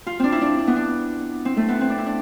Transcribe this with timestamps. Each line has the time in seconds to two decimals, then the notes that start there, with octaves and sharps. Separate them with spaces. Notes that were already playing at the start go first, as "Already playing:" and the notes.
0.07 F4
0.20 C4 D4
0.32 E4
0.41 D4
0.58 D4
0.67 B3
0.76 D4
1.45 C4
1.57 A3
1.69 B3
1.81 C4
1.90 D4
1.98 E4
2.06 D4